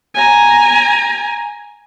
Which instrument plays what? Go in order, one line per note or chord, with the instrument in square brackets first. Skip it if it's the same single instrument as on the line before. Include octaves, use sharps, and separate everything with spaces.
[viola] G#5 A#5